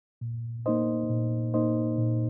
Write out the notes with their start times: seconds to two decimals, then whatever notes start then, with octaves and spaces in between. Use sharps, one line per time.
0.21 A#2
0.66 A#3 D#4 C5 D#5
1.10 A#2
1.54 A#3 D#4 C5 D#5
1.99 A#2